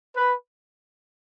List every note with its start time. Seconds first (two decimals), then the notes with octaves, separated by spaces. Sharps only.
0.17 B4